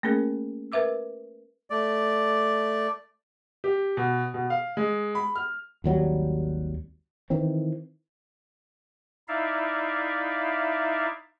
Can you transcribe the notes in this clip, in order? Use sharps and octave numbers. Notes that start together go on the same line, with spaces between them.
A3 A#3 C#4 G#4 A#4
A#4 B4 E5 D6 E6
A3 D5
G4
B2
B2
F5
G#3
B5
F6
G#1 D#2 F#3 G3
D#3 E3 C4
D#4 E4 D5 E5 F5